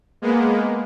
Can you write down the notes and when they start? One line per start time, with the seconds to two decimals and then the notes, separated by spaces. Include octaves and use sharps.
0.22 G#3 A#3 B3